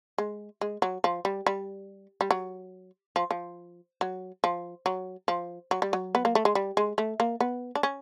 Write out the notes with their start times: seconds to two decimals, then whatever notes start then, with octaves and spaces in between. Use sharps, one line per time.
0.18 G#3
0.61 G#3
0.82 F#3
1.04 F3
1.25 G3
1.47 G3
2.21 G3
2.31 F#3
3.16 F3
3.31 F3
4.01 F#3
4.44 F3
4.86 F#3
5.28 F3
5.71 F#3
5.82 G3
5.93 F#3
6.15 B3
6.25 A#3
6.35 A3
6.45 G#3
6.55 G3
6.77 G#3
6.98 A3
7.20 A#3
7.40 B3
7.75 D4
7.83 C#4